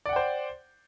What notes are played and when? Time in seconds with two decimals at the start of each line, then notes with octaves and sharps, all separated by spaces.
0.06 D5
0.09 F#5
0.13 G5
0.16 C5